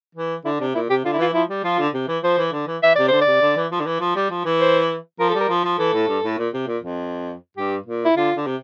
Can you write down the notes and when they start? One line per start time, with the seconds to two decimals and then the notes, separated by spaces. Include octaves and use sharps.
0.15 E3
0.45 D3 E4
0.60 C3 D4
0.75 A#2 E4
0.89 C3 G4
1.05 D3 F4
1.13 E4
1.19 E3 F4
1.34 F3 E4
1.49 G3
1.64 F3 F4
1.79 D3
1.94 C3
2.08 E3
2.23 F3 C5
2.38 E3
2.52 D3
2.67 E3
2.83 E3 E5
2.95 C3 D5
3.08 D3 C5
3.21 D5
3.27 C3
3.41 D3
3.56 E3
3.72 F3
3.80 D3
3.86 E3
4.00 F3
4.16 G3
4.31 F3
4.45 E3
4.61 C5
5.19 F3 A#4
5.30 G3 A4
5.40 A#4
5.49 F3
5.64 F3
5.79 E3 A4
5.93 A2
6.08 G2
6.24 A2
6.38 A#2
6.53 C3
6.67 A#2
6.83 F2
7.57 G2 G4
7.86 A#2
8.05 E4
8.16 D3 F4
8.36 D3
8.46 C3